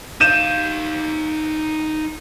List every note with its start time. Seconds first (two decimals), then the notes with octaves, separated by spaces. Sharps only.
0.21 D#4 F5 G6 D#7 E7